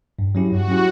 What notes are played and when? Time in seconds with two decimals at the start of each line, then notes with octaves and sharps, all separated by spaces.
0.19 G2
0.35 F#3 C#4 E4 G4
0.51 G2 F#4
0.68 F#3 C#4 E4 G4